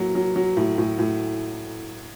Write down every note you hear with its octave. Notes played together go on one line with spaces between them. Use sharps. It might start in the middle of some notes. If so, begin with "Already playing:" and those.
Already playing: A2 F#3 A#3
F#3
F#3
A2
A2
A2